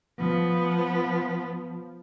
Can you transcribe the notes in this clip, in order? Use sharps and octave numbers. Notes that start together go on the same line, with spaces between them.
F3 B3